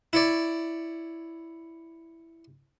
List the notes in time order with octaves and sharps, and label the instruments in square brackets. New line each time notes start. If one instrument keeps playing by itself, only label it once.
[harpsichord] E4 C#5 D5